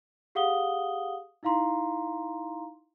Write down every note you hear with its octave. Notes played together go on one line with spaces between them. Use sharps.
G4 G#4 F5 F#5 D#6 G7
D#4 E4 F5 A#5 C6